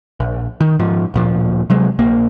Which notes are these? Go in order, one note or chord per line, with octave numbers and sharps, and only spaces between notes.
A#1
D#3
G#2 F3
D1 A#2 F3
C3 F#3 G#3
A#1 A#3